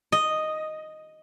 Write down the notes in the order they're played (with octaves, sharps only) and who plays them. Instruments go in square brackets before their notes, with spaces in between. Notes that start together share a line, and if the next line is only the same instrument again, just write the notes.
[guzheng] D#5